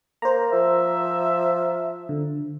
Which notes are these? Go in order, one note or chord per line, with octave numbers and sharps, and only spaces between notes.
A#3 C5 A#5
F3 E5
D3